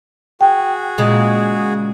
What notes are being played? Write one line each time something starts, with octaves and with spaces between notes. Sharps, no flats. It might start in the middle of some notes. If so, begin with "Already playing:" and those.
F#4 G#4 G5
A#2 C#3 G#3